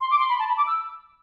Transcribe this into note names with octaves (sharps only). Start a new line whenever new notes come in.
C6
D6
C6
B5
A5
B5
D6
E6